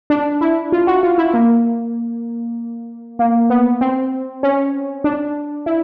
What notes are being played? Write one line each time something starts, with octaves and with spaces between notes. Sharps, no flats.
D4
E4
F4
F#4
F4
E4
A#3
A#3
B3
C4
C#4
D4
E4